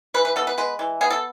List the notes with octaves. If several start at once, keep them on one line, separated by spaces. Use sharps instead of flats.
E3 B4
B4
B3 A4
B4
G#3 B4
E3
B3 G#4
A4